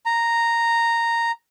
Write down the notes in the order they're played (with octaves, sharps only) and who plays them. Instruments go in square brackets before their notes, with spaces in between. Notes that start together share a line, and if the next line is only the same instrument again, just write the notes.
[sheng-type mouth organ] A#5